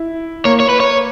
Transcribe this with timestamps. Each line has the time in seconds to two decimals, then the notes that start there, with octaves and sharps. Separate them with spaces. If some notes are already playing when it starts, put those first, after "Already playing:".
Already playing: E4
0.45 A#3 C#5
0.60 C#5
0.69 B4
0.80 C#5